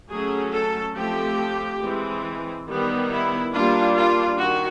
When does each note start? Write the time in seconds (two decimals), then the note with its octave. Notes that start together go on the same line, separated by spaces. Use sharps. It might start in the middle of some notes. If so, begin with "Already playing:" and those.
0.10 F#3 A3 C#4 G#4
0.53 A4
0.96 F3 A3 C4 G4
1.81 E3 G#3 C4
2.68 D#3 G3 B3
3.11 E4
3.53 G3 A#3 D4 F4
3.96 F4
4.39 D#3 F#4